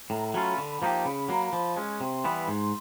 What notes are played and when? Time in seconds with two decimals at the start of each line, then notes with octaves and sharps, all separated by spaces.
0.10 A2 A#5
0.28 A#5
0.34 F#3 A3 C#4 F4 B5
0.58 D3
0.82 F3 A#3 D#4 G4
1.05 C#3 B5
1.29 F#3 A#3
1.53 F3
1.77 G#3 C#4
2.00 C3 C6
2.24 E3 G3 B3
2.48 G#2